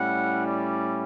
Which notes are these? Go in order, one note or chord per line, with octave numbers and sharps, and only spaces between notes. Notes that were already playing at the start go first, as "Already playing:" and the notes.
Already playing: A2 G3 C#4 E4 F#5
D5